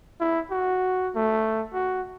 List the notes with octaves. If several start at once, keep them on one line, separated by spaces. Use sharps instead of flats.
E4
F#4
A3
F#4